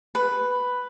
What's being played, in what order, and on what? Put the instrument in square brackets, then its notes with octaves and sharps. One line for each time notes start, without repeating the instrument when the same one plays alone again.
[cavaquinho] B4